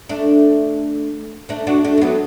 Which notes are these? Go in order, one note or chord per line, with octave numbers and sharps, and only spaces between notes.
A3 D4
A3 D4
D4 F#4
A3 D4
A3
F#3 B3